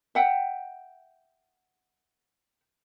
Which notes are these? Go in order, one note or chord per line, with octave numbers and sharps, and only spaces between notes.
E5 F#5 G5